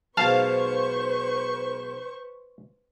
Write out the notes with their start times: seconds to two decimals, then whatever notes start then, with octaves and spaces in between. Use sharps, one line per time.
0.17 B1 G#2 B4 C5 F5 A5 C#6